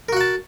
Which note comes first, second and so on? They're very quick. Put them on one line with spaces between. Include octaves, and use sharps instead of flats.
A#4 F#4 F#5 A5